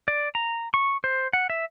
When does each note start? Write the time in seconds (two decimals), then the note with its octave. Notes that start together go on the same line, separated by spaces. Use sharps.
0.08 D5
0.35 A#5
0.74 C#6
1.04 C5
1.33 F#5
1.50 E5